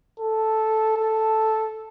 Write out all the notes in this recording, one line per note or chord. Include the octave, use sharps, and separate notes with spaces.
A4
A4